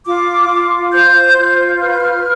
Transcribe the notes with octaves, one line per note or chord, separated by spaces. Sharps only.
F4 D6
F4
C5 G6
F4
B4 F6
G6
F6